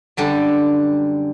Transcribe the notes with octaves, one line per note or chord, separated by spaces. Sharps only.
F#2 D3 G3 A4